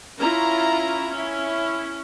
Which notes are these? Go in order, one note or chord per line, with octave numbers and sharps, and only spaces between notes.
C#4 E4 F4 A#5
C#4 E4